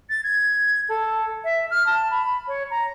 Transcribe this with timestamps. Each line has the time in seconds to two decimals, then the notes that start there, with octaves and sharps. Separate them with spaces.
0.09 A6
0.23 G#6
0.88 A4
1.44 E5
1.70 F6
1.86 A5
2.10 B5
2.48 C#5
2.70 A#5